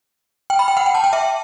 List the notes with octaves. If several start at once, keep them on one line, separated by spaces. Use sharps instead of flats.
G5
B5
G5
F#5
G5
A5
G5
E5